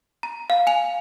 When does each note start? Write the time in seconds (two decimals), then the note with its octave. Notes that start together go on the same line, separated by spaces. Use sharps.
0.23 A#5
0.50 F5
0.67 G#5 F7